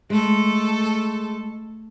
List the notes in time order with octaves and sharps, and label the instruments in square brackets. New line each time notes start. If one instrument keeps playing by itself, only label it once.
[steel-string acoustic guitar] G#3 [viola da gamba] A3 A4